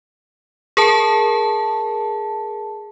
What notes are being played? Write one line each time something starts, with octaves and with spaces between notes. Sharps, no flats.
G#4 A#4 A5